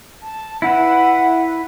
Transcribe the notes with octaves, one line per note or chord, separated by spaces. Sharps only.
A5
E4 B4 F#5